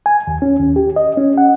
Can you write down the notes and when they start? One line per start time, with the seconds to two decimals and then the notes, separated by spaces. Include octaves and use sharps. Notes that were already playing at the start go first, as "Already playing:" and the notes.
0.06 G#5
0.27 D#2
0.42 C#4
0.59 D#2
0.76 G4
0.96 D#5
1.17 C#4
1.38 F#5